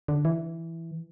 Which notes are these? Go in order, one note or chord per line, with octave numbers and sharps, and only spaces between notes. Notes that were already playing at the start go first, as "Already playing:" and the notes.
D3
E3